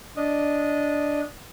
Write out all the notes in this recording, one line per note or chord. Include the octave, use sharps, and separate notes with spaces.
D4 D#5